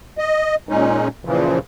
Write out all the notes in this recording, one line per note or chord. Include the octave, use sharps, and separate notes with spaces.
D#5
A#2 G#3 C#4 D#4
A#2 C#3 E3 F3